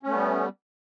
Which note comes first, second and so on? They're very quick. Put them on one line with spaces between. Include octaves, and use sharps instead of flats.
C#4 A3 B3 G3